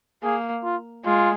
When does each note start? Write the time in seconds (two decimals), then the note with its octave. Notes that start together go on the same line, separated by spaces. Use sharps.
0.23 A#3 G#4
0.64 F4
1.05 G#3 F4